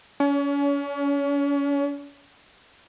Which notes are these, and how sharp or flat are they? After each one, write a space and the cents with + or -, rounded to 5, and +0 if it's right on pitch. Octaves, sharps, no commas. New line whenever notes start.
C#4 +35